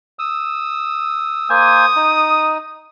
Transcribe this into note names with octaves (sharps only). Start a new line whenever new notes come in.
D#6 E6
A#3 C5 G#5 D#6
D#4